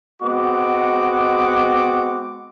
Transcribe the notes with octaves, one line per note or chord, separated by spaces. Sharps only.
G#3 B3 C4 F#4 D#5 D6